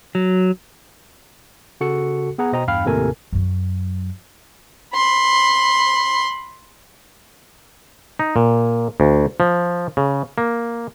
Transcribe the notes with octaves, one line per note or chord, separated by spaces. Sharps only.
F#3
C#3 F#4 A4 C#7
B3 G#4 F#5 A#5
B2 C5 D#5 G5 A#5
E2 G2 F5 G5 B5 F6
D#2 A2 C3 A4 A#4 G#5
F#2 F#3
B5 C6
D#4
A#2
D2
F3
C#3
A#3